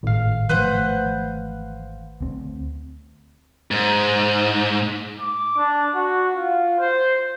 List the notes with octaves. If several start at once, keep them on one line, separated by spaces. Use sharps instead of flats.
G#1 A2 F5
E3 F3 A3 B4 C5 F#5
D2 C4
G#2
D6
D4
F#4
F4
C5